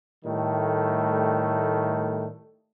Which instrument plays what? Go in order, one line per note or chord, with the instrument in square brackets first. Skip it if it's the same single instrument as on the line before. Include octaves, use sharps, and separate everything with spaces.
[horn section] A2 D#3 G3 A3